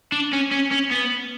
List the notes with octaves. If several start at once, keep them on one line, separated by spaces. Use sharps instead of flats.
D4
C#4
C#4
C#4
B3